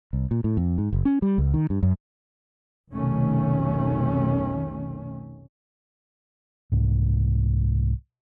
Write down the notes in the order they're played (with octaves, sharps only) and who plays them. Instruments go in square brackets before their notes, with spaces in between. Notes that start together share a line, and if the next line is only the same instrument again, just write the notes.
[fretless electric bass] C2
A#2
A2
F2
G#2
F#1
C#4
G3
C#2
D#3
G2
F#2
[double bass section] F1 B1 C3 D#3 A3 C#4
[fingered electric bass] C2 G#2